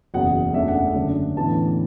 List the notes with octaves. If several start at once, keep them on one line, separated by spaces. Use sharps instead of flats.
F#1 E2 B2 F#5
F#1 E2 E3 A3 D4 E5
F#5
F#1 F#2 D3 A3 D4
A1 A2 E3 B3 D4 A5